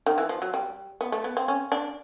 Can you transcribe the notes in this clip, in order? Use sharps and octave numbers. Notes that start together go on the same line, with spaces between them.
D#3
E3
F3
F#3
G3
B3
A3
B3
C4
C#4
D4